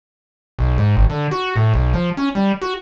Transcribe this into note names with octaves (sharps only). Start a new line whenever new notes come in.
B1
G#2
G#1
D3
F#4
A2
B1
F3
C#4
G3
F#4